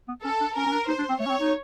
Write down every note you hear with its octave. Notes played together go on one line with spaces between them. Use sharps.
B3
C#4 A4
D4
C#4 A#4
C#4
D4
D#4 C5
D4
C4
A3 C#5
C#4
C4
D#4